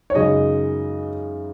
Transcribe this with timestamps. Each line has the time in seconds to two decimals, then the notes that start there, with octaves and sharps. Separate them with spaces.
0.10 C#5
0.15 F#2 C#3 G#3 D#4 D#5